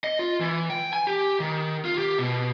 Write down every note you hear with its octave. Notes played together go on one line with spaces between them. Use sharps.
D#5
F4
E3
G5
G#5
G4
D#3
F4
G4
B2